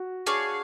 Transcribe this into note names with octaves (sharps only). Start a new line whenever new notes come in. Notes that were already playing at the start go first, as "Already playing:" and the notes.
Already playing: F#4
D4 G#4 C#5 F5